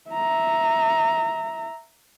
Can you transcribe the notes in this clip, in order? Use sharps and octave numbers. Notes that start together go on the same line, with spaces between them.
E5 A#5